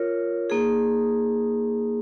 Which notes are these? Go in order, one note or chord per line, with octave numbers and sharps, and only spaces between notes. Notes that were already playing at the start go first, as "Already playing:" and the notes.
Already playing: F4 A#4 C#5
A#3 D#4 G#4